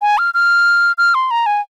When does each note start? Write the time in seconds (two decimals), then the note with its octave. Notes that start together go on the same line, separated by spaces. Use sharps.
0.02 G#5
0.18 F6
0.34 F6
0.98 F6
1.15 C6
1.31 A#5
1.46 G#5